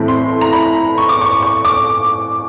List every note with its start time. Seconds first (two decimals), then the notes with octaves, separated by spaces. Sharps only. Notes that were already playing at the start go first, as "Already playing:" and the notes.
Already playing: A2 E3 A3 C4 E4
0.08 C6
0.41 A#5
0.53 B5
0.98 C#6
1.09 D6
1.21 C#6
1.42 C#6
1.65 D6